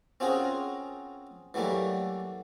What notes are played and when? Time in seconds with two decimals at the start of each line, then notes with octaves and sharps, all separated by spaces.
0.20 C4 C#4 F4 F#4 G#4 A#4
1.54 E3 F#3 G3 A3 A#3